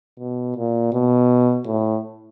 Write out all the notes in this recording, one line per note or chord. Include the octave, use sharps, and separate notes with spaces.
B2
A#2
B2
A2